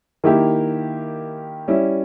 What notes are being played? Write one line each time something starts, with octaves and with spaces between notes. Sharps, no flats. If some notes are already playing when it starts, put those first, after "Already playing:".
D#3 A#3 E4 G4 A#4
G3 C#4 E4